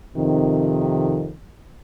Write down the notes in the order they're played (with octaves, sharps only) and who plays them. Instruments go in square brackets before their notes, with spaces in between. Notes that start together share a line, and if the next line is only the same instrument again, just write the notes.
[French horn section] F2 C3 D#3